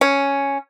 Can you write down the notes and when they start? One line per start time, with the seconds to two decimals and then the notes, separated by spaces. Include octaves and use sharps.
0.01 C#4